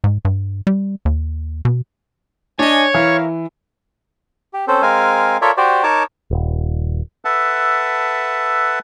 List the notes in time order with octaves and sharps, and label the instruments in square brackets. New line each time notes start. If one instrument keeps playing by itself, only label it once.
[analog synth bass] G#2
G2
G3
D#2
B2
[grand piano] D4 [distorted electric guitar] C#5 [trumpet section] D#5 G#5
[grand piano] E3 [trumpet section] A#4 E5 F5
[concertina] G4
C4 C#4 A4 C5
G#3 C4 A#4 F5 G#5
F4 A4 A#4 C#5 D5 E5
F#4 G4 C5 D5
D#4 A#4 C#5 A5 D6
[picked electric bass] D#1
[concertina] A4 B4 E5 F#5 A5